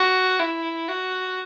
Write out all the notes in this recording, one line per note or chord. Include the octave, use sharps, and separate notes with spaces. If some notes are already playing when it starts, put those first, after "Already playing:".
Already playing: F#4
E4
F#4